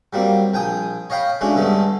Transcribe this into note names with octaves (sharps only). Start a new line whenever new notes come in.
F#3 G3 A#3 C4
A#1 G5 G#5 D#6
C#5 D#5 F5 G5 B5
G#3 A3 C#4 D4 F#4
G2 D3 G#3 A3 B3